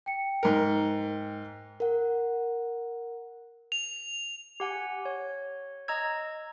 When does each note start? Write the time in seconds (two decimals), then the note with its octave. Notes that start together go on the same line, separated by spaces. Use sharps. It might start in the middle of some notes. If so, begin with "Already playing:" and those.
0.06 G5 C#7
0.43 G#2 A#4
1.80 A#4 F#5
3.72 F7
4.60 G4 F#5 G#5
5.05 C#5
5.88 D#5 A#5 E6 G#6